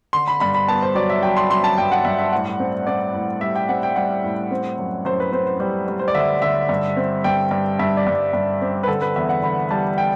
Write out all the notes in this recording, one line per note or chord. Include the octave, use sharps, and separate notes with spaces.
D3 C6
B5
G2 B5
B5
B3 A5
C5
F#3 D5
E5
F#3 G5
C6
F#3 C6
A5
G2 G5
F#5
G2 E5
E5
A2 F#5
C4
C4 D5
A2
G3 E5
G5
C4 F#5
G5
G3 F#5
A2
C4
F#2
F#2 C5
B4
C4 C5
C5
G3
G3
C5
D5
D3 E5
D3 E5
G2
C4
G2 G5
G2
G2 E5
D5
G2
G2
C4
B4
D3 A4
B4
E2 E5
F#5
D3 B5
G3 A5
G5